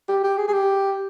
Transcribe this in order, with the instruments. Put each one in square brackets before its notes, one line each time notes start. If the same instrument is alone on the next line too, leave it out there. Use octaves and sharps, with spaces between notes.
[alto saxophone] G4
G4
G#4
G#4
G4